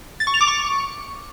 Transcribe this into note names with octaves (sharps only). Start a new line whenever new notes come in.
A6
C#6
F7
D6
C#6